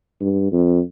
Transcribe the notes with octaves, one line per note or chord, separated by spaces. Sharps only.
G2
F2